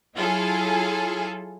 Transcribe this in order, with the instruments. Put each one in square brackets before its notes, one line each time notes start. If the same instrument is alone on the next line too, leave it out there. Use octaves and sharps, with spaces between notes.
[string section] F#3 E4 F4 G#4 A4